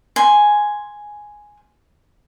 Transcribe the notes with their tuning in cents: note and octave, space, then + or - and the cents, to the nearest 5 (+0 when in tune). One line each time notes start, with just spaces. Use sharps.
G#5 +0 C6 -5